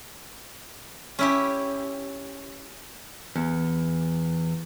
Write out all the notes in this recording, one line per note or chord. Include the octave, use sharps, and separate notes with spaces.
C#4 E4 G4
E2